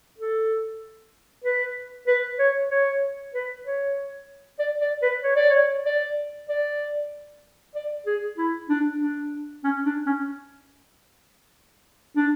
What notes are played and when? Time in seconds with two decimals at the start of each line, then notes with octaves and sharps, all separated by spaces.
0.18 A4
1.44 B4
2.07 B4
2.39 C#5
2.71 C#5
3.34 B4
3.66 C#5
4.59 D5
4.82 D5
5.03 B4
5.24 C#5
5.36 D5
5.50 C#5
5.86 D5
6.49 D5
7.75 D5
8.07 G#4
8.38 E4
8.70 D4
9.01 D4
9.64 C#4
9.86 D4
10.06 C#4
12.17 D4